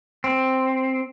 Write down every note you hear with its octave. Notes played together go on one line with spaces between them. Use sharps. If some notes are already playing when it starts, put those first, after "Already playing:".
C4